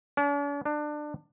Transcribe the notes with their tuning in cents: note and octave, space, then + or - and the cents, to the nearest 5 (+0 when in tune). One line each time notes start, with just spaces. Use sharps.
D4 -45
D4 +25